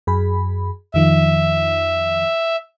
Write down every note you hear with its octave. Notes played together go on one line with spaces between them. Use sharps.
F#2 G#4 B5
F2 D#3 F3 E5